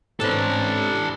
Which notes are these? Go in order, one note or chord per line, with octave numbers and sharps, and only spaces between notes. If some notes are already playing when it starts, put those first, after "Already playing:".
G#2 C3 C#4 D4 A4 B4